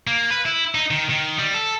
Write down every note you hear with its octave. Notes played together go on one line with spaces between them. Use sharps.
A#3
B4
E4
D#4
D#3
D#3
G3
A4